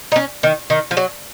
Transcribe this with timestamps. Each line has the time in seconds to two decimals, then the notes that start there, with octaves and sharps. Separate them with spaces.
0.12 D#4
0.16 C#4
0.43 D#3
0.70 D#3
0.91 F3
0.97 F#3